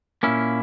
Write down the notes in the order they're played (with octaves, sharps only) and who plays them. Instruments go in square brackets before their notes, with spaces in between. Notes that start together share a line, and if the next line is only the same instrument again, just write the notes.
[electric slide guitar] A#2 A#3 C#4 E4